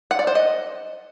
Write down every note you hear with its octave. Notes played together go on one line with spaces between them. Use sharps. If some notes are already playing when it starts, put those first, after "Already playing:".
F#5
D5
C5
D#5